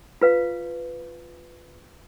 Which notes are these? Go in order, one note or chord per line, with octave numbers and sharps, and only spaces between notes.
F4 B4 F5